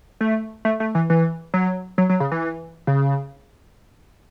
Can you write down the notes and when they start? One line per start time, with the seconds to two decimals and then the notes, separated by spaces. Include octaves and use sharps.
0.21 A3
0.65 A3
0.80 A3
0.95 E3
1.10 E3
1.54 F#3
1.98 F#3
2.10 F#3
2.20 C#3
2.32 E3
2.87 C#3